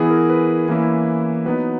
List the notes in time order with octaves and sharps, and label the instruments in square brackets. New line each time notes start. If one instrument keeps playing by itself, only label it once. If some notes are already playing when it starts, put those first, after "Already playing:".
Already playing: [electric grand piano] E3 B3 E4 G#4
A#4
B4
E3 A#3 C#4 E4
F#3 B3 D#4 B4